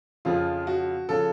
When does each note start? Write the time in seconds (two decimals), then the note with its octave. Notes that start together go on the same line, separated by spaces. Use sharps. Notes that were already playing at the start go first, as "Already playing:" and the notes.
0.25 F2 C#3 F3 F4
0.67 F#4
1.09 C#3 F3 A4